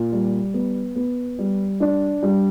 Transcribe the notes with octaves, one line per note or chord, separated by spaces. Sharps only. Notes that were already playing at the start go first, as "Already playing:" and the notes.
Already playing: A#2
G3
B3
B3
G3
D4
G3